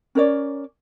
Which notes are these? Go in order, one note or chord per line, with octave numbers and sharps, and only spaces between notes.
C#4 A#4 C#5 D5